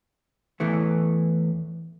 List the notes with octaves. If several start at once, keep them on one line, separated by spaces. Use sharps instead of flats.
E2 A2 E3 A3